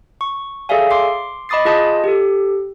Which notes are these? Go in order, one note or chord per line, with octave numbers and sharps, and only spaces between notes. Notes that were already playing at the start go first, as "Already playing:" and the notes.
C#6
G#4 A4 D5 E5 F5 G#5
C6 D6 C7
D#5 B5 D6 D#6 A6 C7
F4 G#4 D#5 A5 D#6 G6
G4 A4